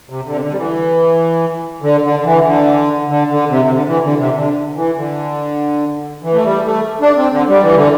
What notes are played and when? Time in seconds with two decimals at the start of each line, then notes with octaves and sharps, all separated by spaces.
0.10 C3
0.26 D3
0.34 C3
0.42 D3
0.52 G3
0.57 E3
1.82 D3
2.04 D3
2.19 D3
2.25 E3
2.45 D3
3.09 D3
3.30 D3
3.50 C3
3.65 C3
3.72 D3
3.87 E3
4.03 D3
4.19 C3
4.34 D3
4.76 E3
4.97 D3
6.23 E3
6.34 A3
6.44 G3
6.65 A3
7.01 D4
7.17 C4
7.32 D3
7.49 G3
7.62 E3
7.76 D3